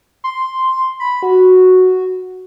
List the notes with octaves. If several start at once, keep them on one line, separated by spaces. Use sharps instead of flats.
C6
B5
F#4